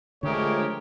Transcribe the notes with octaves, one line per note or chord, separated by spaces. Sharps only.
D3 F3 G#3 A3 G4 G#4 A#4 C#5